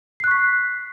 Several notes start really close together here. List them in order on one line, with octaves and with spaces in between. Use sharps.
C7 F#6 C#6 B6